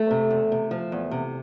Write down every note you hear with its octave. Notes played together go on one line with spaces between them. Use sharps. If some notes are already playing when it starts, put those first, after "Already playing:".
Already playing: A3
C3
E2
C3
F3
E2
C3